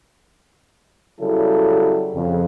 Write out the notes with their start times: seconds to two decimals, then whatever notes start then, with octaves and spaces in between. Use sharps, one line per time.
1.19 C#3 F#3 G3 E4 A4
2.14 F2 C#3